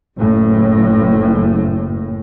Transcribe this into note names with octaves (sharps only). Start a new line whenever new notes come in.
F#1 A2